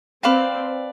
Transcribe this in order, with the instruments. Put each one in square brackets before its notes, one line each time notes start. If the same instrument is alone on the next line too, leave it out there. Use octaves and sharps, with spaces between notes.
[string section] C4 [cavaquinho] B4 D5 F5 A5